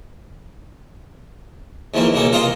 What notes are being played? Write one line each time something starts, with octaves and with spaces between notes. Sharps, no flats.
D#2 G#2 E3 F3 A#3
C#2 B2 G#3 A#3 A4
C3 F4 A#4 D#5 F5 C6